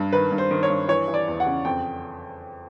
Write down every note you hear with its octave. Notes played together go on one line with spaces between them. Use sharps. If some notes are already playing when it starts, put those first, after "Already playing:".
Already playing: G2
D#3 B4
G2
C5
D#3
C#5
G2
E3 C#5
E3
D5
E2
F#5
C#3
F2 G5